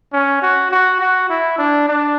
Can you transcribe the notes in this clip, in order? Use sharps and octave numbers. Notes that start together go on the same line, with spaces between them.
C#4
F#4
F#4
F#4
E4
D4
D4